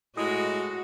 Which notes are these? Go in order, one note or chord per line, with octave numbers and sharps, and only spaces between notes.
A2 G#3 F#4 D#6